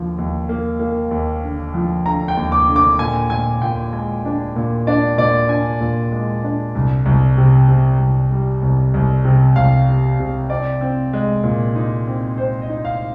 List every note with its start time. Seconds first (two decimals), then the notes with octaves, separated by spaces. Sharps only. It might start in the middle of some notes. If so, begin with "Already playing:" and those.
Already playing: D#2 D3 F3
0.18 D#2
0.49 A#3
0.80 A#3
1.11 D#2
1.43 D3
1.74 F3
2.05 D3 A#5
2.28 G5
2.37 D#2
2.52 D6
2.68 D3
2.76 D6
2.99 A#2 G#5
3.30 A#2 G#5
3.62 A#2 G5
3.93 G#3 G#5
4.25 D4
4.56 A#2
4.87 D4 D5
5.18 A#2 D5
5.49 D4 G#5
5.81 A#2
6.12 G#3
6.44 D4
6.75 C2
7.06 C2
7.38 C3
7.68 C3
7.99 C2
8.31 G3
8.62 C2
8.94 C2
9.25 C3
9.56 C2 F5
9.88 G3
10.19 C3
10.50 C4 D5
10.81 C4
11.13 G#3
11.44 A#2
11.76 D#4
12.07 C4
12.38 C4 C5
12.62 D#5
12.69 D#4
12.85 F5